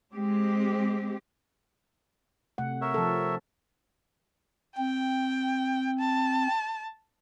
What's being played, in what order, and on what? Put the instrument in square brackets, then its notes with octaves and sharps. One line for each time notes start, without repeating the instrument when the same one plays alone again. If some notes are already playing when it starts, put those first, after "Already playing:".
[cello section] G#3 C4 G4
[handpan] C3 A3 F#5
[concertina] A#4 C#5 E5
[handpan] F3 A4
[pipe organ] C4 [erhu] G5
[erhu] A5